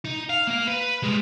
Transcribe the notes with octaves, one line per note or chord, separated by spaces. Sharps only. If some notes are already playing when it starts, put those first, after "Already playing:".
D#4
F5
A#3 F5
B4
G3 G#3